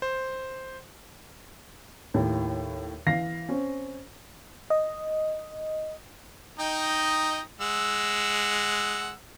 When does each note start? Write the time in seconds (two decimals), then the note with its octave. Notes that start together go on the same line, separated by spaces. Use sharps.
0.02 C5
2.14 D#2 A2
3.06 E3 F5 A#6 C7
3.49 C4 C#4
4.70 D#5
6.60 D#4 D#5 G5
7.61 G#3 F#5 E6